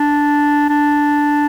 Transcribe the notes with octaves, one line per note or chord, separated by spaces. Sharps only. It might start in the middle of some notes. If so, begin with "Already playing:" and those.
Already playing: D4
D4